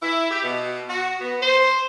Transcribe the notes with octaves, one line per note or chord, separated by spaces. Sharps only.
E4
G4
B2
F#4
B3
C5